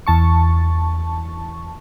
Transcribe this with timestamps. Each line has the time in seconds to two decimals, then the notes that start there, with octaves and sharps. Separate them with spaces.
0.07 E2 A5 C#6